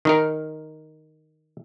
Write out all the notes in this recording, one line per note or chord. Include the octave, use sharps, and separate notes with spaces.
D#3 D#4 A#4